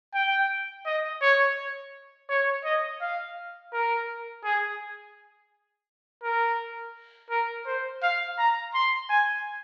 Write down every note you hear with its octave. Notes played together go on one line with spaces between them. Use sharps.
G5
D#5
C#5
C#5
D#5
F5
A#4
G#4
A#4
A#4
C5
F5
A#5
C6
G#5